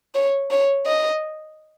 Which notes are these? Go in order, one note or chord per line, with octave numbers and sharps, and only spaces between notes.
C#5
C#5
D#5